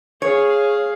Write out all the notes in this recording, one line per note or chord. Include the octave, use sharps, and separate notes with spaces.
G#4 C#5 F5